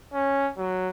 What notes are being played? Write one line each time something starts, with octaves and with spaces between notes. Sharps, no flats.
C#4
F#3